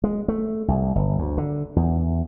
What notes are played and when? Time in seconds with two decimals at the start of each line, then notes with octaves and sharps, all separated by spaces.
0.04 G#3
0.28 A3
0.68 C2
0.95 G1
1.19 D2
1.38 D3
1.76 E2